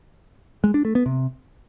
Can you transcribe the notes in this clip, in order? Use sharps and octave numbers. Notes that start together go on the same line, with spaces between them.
G#3
D4
A3
B3
C3